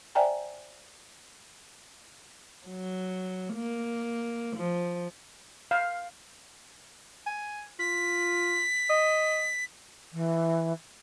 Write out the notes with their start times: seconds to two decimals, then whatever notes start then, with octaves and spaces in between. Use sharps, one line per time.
0.15 C5 D5 E5 G5 G#5 A#5
2.67 F#3
3.54 A#3
4.56 F3
5.71 F5
7.26 G#5
7.79 F4 B6
8.90 D#5
10.13 E3